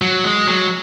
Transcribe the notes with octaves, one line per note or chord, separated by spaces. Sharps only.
F#3
G#3
F#3